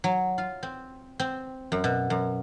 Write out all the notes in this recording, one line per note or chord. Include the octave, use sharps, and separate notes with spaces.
F#3
F4
C4
C4
F#2
B2
F#2